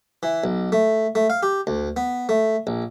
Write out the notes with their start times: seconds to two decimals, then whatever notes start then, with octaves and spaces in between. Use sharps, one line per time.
0.23 E3
0.44 B1
0.72 A3
1.15 A3
1.30 F5
1.43 G4
1.67 D2
1.97 B3
2.29 A3
2.67 A#1